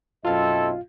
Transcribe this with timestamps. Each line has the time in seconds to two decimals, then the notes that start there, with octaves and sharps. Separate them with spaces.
0.25 B1 F#2 C4 E4 F4 A4 D#5 F5